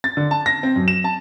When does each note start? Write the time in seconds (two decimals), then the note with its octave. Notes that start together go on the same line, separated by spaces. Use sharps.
0.04 A6
0.17 D3
0.31 A5
0.46 A#6
0.63 C4
0.76 F#2
0.88 E7
1.04 A5